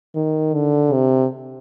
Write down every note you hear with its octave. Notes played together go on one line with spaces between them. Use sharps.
D#3
D3
C3